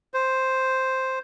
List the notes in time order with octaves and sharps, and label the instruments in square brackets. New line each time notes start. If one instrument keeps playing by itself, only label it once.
[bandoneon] C5